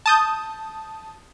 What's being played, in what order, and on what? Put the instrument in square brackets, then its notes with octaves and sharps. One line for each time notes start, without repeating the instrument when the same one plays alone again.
[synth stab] A5 D#6 G6